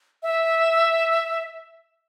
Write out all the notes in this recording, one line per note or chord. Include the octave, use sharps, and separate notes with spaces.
E5